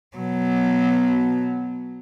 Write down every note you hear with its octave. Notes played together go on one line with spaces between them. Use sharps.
B2 F#3